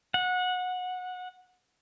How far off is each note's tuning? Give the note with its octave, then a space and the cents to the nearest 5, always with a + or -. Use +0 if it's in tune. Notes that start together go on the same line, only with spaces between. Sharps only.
F#5 -20